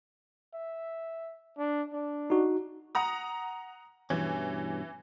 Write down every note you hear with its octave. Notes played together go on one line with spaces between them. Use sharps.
E5
D4
D4
D#4 F#4
F#5 A#5 D#6
G2 B2 E3 C#4